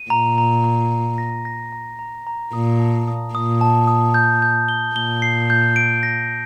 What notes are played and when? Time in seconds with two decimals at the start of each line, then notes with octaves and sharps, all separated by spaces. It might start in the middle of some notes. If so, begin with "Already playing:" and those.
Already playing: D#7
0.10 A#2 A#5
0.38 A#5
0.64 A#5
0.92 A#5
1.18 A#6
1.45 A#6
1.72 A#5
1.99 A#5
2.27 A#5
2.53 A#2 D#6
2.80 A5
3.08 D#6
3.35 A#2 D#6
3.61 A5
3.88 D#6
4.14 G6
4.42 G6
4.69 G7
4.95 A#2 G7
5.22 C7
5.50 G6
5.76 D7
6.03 A#6